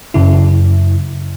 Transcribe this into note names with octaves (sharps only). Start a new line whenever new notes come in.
F#2 C#3 E4